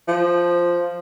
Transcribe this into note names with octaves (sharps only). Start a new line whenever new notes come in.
F3